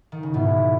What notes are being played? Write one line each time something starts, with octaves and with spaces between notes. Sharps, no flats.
D#3
C#3
G#2 B2 E4